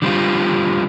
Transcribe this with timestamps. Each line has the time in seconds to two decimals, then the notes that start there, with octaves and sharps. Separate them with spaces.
0.02 D3 G3 C4 F4